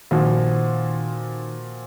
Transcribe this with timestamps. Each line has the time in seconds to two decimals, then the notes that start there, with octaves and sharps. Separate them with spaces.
0.11 A#2 D#3 F3 C4 F#4